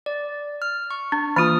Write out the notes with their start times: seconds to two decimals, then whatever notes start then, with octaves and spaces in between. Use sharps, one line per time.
0.06 D5
0.62 F6
0.91 C#6
1.12 D4
1.36 E3 A#3 F4 D#6 F6